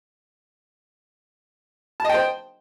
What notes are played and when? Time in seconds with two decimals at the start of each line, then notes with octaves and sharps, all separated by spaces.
2.00 A5
2.05 D#5
2.09 G5
2.14 C5